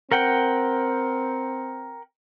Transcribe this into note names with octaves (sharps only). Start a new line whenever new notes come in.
C4 A#4 F#5 G5